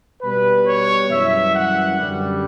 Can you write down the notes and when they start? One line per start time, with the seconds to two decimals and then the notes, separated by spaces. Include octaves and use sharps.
0.21 B2 G3 B4
0.65 C#5
1.10 F#2 E3 G3 E5
1.54 F#5
1.99 F#2 D3 G3